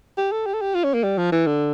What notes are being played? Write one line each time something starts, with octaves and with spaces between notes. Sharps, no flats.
G4
A4
G4
A4
G4
F4
C#4
A#3
G3
F3
E3
D3